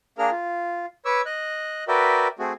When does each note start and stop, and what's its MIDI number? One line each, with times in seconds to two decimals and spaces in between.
0.18 0.30 58
0.18 0.30 62
0.18 0.30 68
0.18 0.30 70
0.18 0.30 89
0.31 0.86 65
1.05 1.22 71
1.05 1.22 73
1.05 1.22 85
1.05 1.22 86
1.05 1.22 88
1.26 1.84 75
1.26 1.84 90
1.88 2.27 66
1.88 2.27 70
1.88 2.27 71
1.88 2.27 74
1.88 2.27 76
1.88 2.27 79
2.39 2.53 57
2.39 2.53 60
2.39 2.53 66
2.39 2.53 68